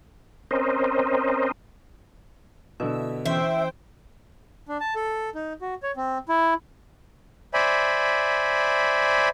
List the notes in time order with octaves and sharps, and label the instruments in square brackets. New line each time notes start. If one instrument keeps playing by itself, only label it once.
[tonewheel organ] C4 C#4 A#4 C5 D#5
[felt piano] B2 D3 [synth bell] E4 E5
[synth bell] E3 C#4 G6 [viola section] C5 G5 [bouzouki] E5
[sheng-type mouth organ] D4
A5
A4
D#4
F#4
C#5
C4
E4
C5 D5 E5 G#5 B5